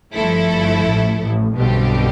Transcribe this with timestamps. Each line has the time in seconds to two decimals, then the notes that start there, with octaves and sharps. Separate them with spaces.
0.13 G1 G2 F3 A3 E4 A4
0.49 G1 G2
0.84 A1 A2
1.19 A1 A2
1.55 B1 G2 B2 D3 G3 C4 G4